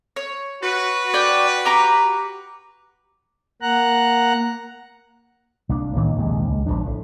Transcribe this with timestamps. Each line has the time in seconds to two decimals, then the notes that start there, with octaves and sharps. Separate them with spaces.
0.16 C#5
0.62 F#4 B4
1.13 D4 D5 G5
1.65 G4 A#5 D6
3.62 A#3 F#5 A#5 F#6
5.69 C2 A#3 D4
5.96 A2 D#3 E3 A#3
6.16 A#1 D#2 C3 G#3
6.48 C#2
6.66 F1 F2 F3 D4
6.86 A2